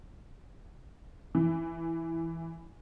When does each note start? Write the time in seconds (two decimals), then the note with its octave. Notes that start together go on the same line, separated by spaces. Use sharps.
1.35 E3